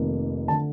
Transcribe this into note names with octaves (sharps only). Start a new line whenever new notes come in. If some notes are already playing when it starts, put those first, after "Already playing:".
Already playing: F1 F2 D#3 A#3
D3 A3 A5